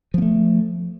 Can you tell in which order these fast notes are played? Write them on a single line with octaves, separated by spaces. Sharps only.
F3 A#3 A3